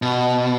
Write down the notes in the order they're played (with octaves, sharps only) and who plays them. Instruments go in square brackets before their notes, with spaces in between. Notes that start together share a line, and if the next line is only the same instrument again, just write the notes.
[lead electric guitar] B2